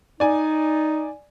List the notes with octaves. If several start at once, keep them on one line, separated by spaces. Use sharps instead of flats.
D#4 D5 G#5